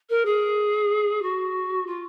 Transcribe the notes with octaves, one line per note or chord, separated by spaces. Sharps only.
A#4
G#4
F#4
F4